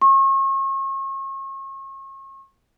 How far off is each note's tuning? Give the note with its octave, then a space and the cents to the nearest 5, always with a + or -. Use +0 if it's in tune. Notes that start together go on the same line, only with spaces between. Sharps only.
C#6 -40